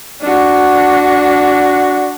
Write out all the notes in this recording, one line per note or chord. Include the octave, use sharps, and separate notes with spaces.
D4 F#4